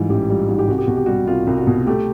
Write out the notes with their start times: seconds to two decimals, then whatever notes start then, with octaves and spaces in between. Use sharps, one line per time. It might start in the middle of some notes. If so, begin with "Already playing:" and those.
Already playing: G#2 E3 G3 F4
0.09 A1 G4
0.29 G3 F4
0.49 G#2 F#4
0.59 G4
0.68 C2 F#4
0.78 G4
0.87 B2 F#4
0.97 G4
1.06 G3 F#4
1.27 C2 F4
1.47 C2
1.58 F#4
1.67 B2
1.86 A3 G4